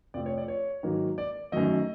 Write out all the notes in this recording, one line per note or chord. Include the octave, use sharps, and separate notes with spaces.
F2 C3 F3 A3 D5
C#5
D5
C#5
G#2 D#3 F#3 A#3
D5
F#2 D#3 F#3 A3 D#5